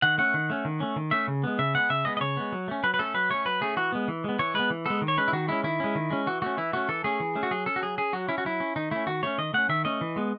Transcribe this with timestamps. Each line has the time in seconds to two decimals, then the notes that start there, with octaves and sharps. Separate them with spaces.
0.02 D#3 F#5
0.18 A3 C#4 F#5
0.34 D#3
0.50 A3 C#4
0.65 D#3
0.80 A3 C#4
0.96 D#3
1.11 A3 C#4 E5
1.28 C#3
1.44 G#3 B3
1.59 C#3 E5
1.75 G#3 B3 F#5
1.90 C#3 E5
2.05 G#3 B3 D#5
2.17 D#5
2.21 C#3 C#5
2.37 G#3 B3
2.52 F#3
2.68 A3 C#4
2.83 F#3 B4
2.94 B4
2.99 A3 C#4 A4
3.14 F#3 B4
3.30 A3 C#4 C#5
3.45 F#3 B4
3.61 A3 C#4 G#4
3.77 E3 F#4
3.92 G#3 B3
4.08 E3
4.24 G#3 B3
4.39 E3 C#5
4.54 G#3 B3 B4
4.70 E3
4.86 G#3 B3 A4
5.02 D#3
5.08 C#5
5.17 G#3 C#4 B4
5.28 E4
5.33 D#3 F#4
5.48 G#3 C#4 E4
5.63 D#3 E4
5.80 G#3 C#4
5.95 D#3
6.10 G#3 C#4
6.27 E3 F#4
6.42 A3 C#4 F#4
6.58 E3 E4
6.73 A3 C#4 F#4
6.89 E3 A4
7.04 A3 C#4 G#4
7.20 E3
7.35 A3 C#4
7.43 F#4
7.51 F#3 G#4
7.66 C#4 A4
7.76 F#4
7.82 F#3 G#4
7.98 C#4 G#4
8.13 F#3 F#4
8.29 C#4 E4
8.38 F#4
8.45 F#3 E4
8.60 C#4
8.76 D#3 D#4
8.91 A3 C#4 E4
9.07 D#3 F#4
9.23 A3 C#4 C#5
9.38 D#3 D#5
9.54 A3 C#4 F#5
9.69 D#3 E5
9.85 A3 C#4 D#5
10.01 E3
10.16 G#3 B3